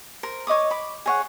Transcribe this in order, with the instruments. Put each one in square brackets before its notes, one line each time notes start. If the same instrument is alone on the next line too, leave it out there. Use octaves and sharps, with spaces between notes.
[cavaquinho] A#4 C5
C#5 D#5 D6 D#6
B5 D6
G#4 C#5 F#5